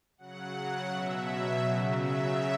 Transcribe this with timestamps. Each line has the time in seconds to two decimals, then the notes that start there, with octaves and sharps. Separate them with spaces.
0.18 C#3 F#3 F#5
0.54 F#5
0.91 B2 F#3 E5
1.64 C#3 F#3
2.00 E5